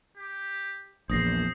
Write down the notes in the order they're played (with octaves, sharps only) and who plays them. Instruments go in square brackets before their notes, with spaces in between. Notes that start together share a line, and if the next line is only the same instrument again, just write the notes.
[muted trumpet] G4
[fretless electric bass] A#1 E2 [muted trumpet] C5 [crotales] D#6 A#6 C7